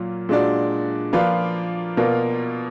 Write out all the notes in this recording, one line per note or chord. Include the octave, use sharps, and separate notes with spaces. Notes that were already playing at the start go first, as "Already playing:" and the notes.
Already playing: A#2 F#3 A#3 F4
A#2 G#3 D4 F#4 D5
F3 A#3 F4 B4 D5
B2 A#3 F4 A#4 D5